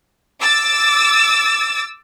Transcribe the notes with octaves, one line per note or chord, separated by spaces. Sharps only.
D6 E6 A6